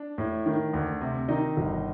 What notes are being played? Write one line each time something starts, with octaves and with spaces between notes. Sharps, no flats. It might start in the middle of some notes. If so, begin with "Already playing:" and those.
Already playing: D4
A2
D#3
D2
C3
D#3 D#4 D#5
G1